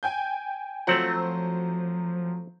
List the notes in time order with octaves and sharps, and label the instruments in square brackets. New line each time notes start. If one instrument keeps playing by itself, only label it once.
[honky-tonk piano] G5 G#5 G6
[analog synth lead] F3 [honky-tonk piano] F#3 C5 [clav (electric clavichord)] A3 C4 F#5